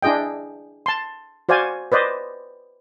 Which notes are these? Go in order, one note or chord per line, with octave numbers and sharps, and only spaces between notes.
D4 E4 G#4 D#5 G5
A5 C6
F#4 C5 D5 F5 G#5
B4 C5 D5 D#5